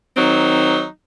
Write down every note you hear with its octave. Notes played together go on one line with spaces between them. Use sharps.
D#3 F#3 C4 D#4